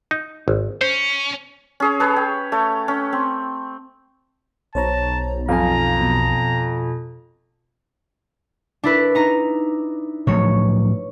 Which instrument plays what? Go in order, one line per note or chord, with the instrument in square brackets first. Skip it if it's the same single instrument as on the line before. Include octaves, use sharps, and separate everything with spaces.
[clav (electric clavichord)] D#4
G#1
[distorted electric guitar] C#4 [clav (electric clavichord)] C5
[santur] C#4 G#4 C#5
G#4 B4 C#5
G5
A3 C#5
C#4
C4
[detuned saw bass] B1 [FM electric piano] C5 C#5 A#5 [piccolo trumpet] A5
[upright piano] F2 G#5 [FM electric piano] F5 [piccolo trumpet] A#5
[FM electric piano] B2
[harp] D4 E4 B4
D#4 A#5
[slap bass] A2 F3 F#3 [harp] C#5